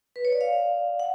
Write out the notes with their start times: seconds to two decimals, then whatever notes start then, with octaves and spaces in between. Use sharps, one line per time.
0.16 B4
0.25 C#5
0.32 D5
0.41 F5
1.00 F#5